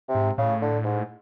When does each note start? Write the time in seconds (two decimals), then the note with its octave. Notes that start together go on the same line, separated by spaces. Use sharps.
0.08 C3
0.15 G#2
0.38 A2 C#3
0.62 D3
0.84 G#2